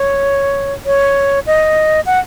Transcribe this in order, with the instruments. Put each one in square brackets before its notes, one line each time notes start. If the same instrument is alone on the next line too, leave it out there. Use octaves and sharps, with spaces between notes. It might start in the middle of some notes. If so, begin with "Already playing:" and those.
Already playing: [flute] C#5
C#5
D#5
F#5